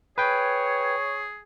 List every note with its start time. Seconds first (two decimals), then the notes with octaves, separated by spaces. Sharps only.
0.18 G#4 B4 C#5 G5